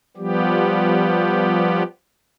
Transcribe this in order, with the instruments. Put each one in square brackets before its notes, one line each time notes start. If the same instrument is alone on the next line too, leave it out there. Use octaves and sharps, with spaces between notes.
[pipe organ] F3 G3 B3 G4